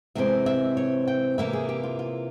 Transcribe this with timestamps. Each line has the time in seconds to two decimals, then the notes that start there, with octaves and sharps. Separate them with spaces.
0.15 C3 E3 G#3 C4 E5
0.46 E5
0.77 C#5
1.08 G5
1.38 C3 E3 A#3 E4 E5
1.53 G#4
1.69 G4
1.83 F4
1.99 F4